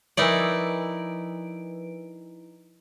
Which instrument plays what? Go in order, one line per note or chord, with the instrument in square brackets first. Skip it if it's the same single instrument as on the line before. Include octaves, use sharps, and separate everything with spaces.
[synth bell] F3 B4 D7 [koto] D#4 E4 D5